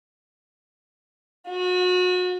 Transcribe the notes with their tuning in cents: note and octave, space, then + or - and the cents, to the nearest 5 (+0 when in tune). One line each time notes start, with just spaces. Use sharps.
F#4 -35